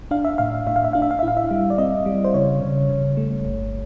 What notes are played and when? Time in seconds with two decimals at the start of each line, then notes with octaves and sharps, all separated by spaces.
0.11 D4 F5
0.25 E5
0.38 A2 F5
0.67 A2 E5
0.76 F5
0.85 E5
0.93 D4 F5
1.02 E5
1.11 F5
1.19 E5
1.23 E4
1.28 F5
1.37 E5
1.51 G3
1.70 D5
1.78 C4 D#5
2.06 G3
2.24 C5
2.34 C#3 C#5
2.61 C#3
2.89 C#3
3.17 A3
3.45 G1